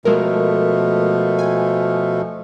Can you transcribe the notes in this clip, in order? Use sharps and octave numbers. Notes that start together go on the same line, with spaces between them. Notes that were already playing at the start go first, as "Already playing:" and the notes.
B2 F3 G#3 A3 A4 A#4
G#5